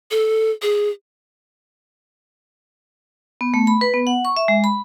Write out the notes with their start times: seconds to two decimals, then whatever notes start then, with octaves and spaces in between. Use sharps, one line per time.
0.11 A4
0.62 G#4
3.41 B3
3.54 A3
3.67 B5
3.81 B4
3.94 B3
4.07 F#5
4.25 C#6
4.37 E5
4.48 G#3
4.64 B5